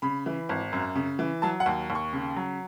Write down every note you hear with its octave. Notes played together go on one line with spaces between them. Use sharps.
C#3 B5
E3
G#1
F#2
C#3
E3
F#3 A5
F#5
D#2
D#2
C#6
C#3
F#3